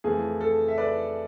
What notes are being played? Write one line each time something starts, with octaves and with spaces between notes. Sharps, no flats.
F2 E3 A3 G#4
A4
E5
B4 D5